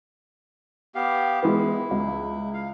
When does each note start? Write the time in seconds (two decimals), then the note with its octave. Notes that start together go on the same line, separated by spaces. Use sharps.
0.95 B3 G4 F5
1.43 E3 G#3 B3 E4
1.91 C#2
2.54 F5